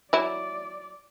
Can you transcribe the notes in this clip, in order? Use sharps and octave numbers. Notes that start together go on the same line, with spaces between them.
F#3 E4 D5